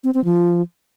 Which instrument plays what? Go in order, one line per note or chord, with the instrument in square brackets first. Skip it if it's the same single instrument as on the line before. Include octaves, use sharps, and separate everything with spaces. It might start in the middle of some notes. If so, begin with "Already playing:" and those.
[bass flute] C4
C4
F3